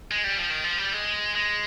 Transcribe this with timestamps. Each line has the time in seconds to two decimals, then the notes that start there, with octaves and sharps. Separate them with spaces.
0.11 G#3
0.24 G3
0.37 F3
0.50 D#3
0.64 F3
0.78 G3
0.93 G#3
1.35 G#3